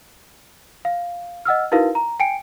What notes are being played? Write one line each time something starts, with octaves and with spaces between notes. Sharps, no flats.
F5
D#5 F#5 E6 F6
D#4 E4 F#4 A#4 B4 F5
A#5
G5 G#5 C#7 D7